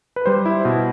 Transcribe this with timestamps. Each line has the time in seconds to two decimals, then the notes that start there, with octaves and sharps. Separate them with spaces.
0.16 B4
0.26 G3 C5
0.46 E4
0.65 B2